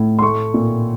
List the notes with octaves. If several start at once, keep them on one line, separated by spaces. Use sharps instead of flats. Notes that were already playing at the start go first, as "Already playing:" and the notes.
Already playing: A2
C6
A3 C#6
A#2